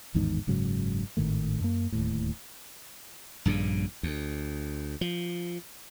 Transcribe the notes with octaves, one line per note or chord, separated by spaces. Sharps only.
A1 E2 G#2 D#3
F#1 G#2 C#3 F#3
G#1 A2 D#3 A3
F#2 A#3
D1 D#2 A2
A#1 G2 A#2 C#3
D2
F3